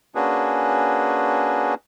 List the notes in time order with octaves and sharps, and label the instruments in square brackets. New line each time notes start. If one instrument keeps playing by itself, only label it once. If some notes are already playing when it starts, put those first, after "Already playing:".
[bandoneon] A#3 C#4 D4 F#4 G#4 B4